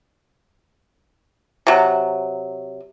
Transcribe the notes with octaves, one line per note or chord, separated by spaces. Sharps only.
C3 F#3